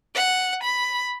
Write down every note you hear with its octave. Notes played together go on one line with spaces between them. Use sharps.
F#5
B5